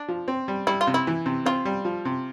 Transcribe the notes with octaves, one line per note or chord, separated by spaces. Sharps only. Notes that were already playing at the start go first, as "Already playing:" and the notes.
Already playing: D4
F3
C4
G3
G3 E4
F4
C3
E4
E3
C3
C4 F4
G3
F3
C3